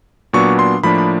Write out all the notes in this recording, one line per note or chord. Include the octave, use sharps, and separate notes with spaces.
A#2 F#3 B3 D4 C#6
C6
A2 F3 A#3 D4 B5
B5